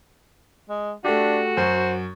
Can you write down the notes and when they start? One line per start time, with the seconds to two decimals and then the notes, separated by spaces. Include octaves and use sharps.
0.69 G#3
1.05 A3 D4 F#4 G4
1.57 F#2 C5